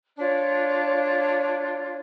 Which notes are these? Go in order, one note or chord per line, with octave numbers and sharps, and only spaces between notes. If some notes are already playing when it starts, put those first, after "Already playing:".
D4 F4 C#5